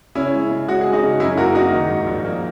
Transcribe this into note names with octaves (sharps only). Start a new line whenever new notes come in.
C#3 C#4 E4
G#3
C#3
G#3 F#4
G#3 G#4
D#4 F#4
C#3
F#2 E4 G#4
A#3 F#4 A#4
A#3 D#4 F#4
D#3
G#2
A#1
A#3